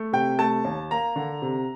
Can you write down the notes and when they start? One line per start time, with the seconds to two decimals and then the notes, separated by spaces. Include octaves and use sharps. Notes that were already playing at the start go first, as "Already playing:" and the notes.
Already playing: A3
0.13 C3 G5
0.38 A3 A5
0.65 D#2
0.91 A#3 A#5
1.16 D3
1.42 C3